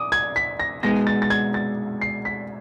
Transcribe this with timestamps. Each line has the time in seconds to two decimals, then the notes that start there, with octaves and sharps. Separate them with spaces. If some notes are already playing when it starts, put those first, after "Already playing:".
Already playing: D6 D#6
0.12 G#6
0.36 B6
0.60 A#6
0.83 B2 G#3 B3 D#4 A#6
1.07 A6
1.22 A6
1.30 G#6
1.54 A6
2.01 C7
2.25 B6